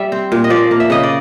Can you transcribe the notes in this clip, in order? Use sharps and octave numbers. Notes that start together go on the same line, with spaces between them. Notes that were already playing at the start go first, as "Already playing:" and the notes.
Already playing: G3 E5
C4
A#2
D#5
F3 D5
A#3
E5
C#3 D#5
D5